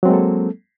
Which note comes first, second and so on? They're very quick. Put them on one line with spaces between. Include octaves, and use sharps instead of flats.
F#3 C4 G#3 A#3 A4